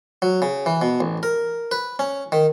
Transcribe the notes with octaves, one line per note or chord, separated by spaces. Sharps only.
F#3
C#3
E3
B2
A1
A#4
B4
C#4
D#3